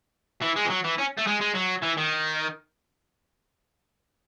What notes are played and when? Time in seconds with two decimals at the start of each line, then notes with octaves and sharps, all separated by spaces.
0.42 E3
0.56 G#3
0.65 E3
0.70 F#3
0.84 E3
0.98 C#4
1.17 A3
1.27 G#3
1.41 G#3
1.55 F#3
1.83 E3
1.98 D#3